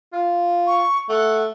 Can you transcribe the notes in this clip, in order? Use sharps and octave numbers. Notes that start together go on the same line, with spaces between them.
F4
C#6
A3 F#5